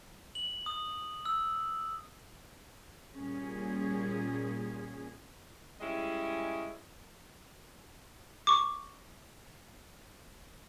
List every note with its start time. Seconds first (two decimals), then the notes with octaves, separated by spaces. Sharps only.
0.35 F#7
0.66 D#6
1.25 E6
3.15 A#2 G3 C#4 G#4
5.81 G3 G#3 C#4 E4 D#5
8.47 C#6 D6